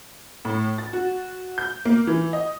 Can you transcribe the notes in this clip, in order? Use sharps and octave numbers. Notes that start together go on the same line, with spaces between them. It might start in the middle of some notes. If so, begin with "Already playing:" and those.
A2
A6
F#4
G6
A#3
E3
D#5